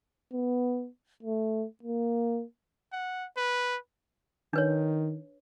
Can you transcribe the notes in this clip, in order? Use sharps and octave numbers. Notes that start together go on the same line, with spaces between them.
B3
A3
A#3
F#5
B4
D#3 D4 B4 C#5